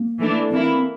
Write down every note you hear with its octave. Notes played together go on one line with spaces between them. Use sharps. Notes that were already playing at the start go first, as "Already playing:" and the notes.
Already playing: A#3
E3 A3 D4
E3 A#3 C4 E4